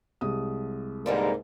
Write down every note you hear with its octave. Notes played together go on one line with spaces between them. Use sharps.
C2 G#3 D#6
G#2 D3 G3 A#3 B3